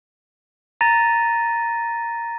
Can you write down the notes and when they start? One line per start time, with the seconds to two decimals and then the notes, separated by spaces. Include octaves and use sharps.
0.81 A#5 A6 A#6 D#7